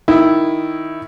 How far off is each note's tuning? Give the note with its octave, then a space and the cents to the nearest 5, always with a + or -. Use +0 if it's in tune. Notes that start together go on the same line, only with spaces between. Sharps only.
D#3 +0 E4 +0